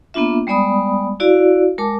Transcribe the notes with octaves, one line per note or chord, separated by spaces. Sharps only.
A#3 B3 D4 F4 E5
G3 G#3 B3 D5 B5 D#6
E4 F#4 D5 F5
G#3 A#4 A5 D6